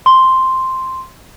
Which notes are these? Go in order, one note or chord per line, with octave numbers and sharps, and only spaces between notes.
C6